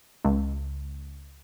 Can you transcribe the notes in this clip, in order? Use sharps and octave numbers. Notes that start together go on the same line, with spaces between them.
C#2